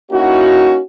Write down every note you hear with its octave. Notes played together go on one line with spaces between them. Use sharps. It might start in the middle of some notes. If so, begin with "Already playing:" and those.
A#3 C#4 D#4 E4 F#4